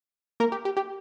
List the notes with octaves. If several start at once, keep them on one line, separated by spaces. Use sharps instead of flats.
A#3 A#4
G4
G4
G4